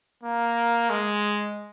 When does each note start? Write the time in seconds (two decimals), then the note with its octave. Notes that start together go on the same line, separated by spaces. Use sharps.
0.24 A#3
0.90 G#3